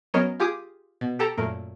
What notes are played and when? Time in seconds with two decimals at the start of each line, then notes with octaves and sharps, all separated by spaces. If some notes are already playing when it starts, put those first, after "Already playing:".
0.14 F#3 B3 C#4 A#4 C#5 D#5
0.40 F4 G4 G#4 D6 D#6
1.01 B2
1.19 G4 A4 G5 A5 A#5
1.37 F#2 A#2 A3 A#4